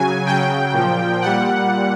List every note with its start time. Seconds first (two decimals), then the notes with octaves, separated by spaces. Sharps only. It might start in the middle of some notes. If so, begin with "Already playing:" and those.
Already playing: C#3 F#3 G#5
0.26 C#3 F#3 G5
0.74 A#2 F3
1.22 A#2 G3 F#5